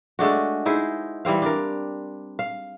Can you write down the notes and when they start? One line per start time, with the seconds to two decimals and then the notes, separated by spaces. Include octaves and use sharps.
0.19 G#3 A3 D4 F#4
0.66 D#4 E4 G#4 C5
1.25 E3 G3 C4 F5
1.42 D4 A#4
2.39 F5